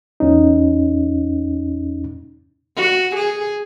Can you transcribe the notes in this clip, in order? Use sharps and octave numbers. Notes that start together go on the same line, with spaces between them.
E2 C#4 D#4
F#4
G#4